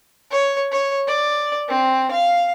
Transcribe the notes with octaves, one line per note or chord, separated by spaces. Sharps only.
C#5
C#5
D5
C4
F5